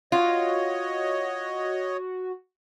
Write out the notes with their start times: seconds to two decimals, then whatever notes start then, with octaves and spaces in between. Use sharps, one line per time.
0.12 F4 F#4 C#5 D#5